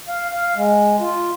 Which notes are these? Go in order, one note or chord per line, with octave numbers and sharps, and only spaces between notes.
F5
F5
G#3
F4